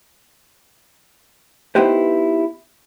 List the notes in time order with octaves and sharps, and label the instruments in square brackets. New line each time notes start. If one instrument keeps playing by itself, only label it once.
[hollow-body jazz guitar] B3 D#4 E4 G4 B4 C5